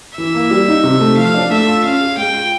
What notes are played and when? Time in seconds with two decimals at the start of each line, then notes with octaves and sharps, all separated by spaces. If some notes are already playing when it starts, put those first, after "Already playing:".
0.17 E3 E5
0.35 A#3
0.51 G3
0.68 D#4
0.84 C3
1.00 A3
1.17 F3 F5
1.34 D4
1.51 A3 E5
1.67 F4
1.84 C#4 F5
2.01 G#4
2.17 G#3 G5
2.34 F4